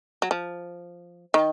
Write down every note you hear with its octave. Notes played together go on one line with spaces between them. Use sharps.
F#3
F3
D#3